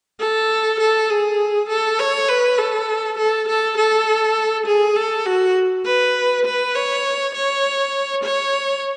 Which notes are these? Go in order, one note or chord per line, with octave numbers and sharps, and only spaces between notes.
A4
A4
G#4
A4
C#5
B4
A4
A4
A4
A4
G#4
A4
F#4
B4
B4
C#5
C#5
C#5